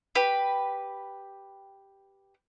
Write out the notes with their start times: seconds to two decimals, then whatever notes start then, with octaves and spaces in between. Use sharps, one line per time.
0.15 G4 B4